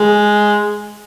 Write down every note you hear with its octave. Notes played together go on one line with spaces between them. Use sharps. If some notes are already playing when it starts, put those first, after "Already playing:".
Already playing: G#3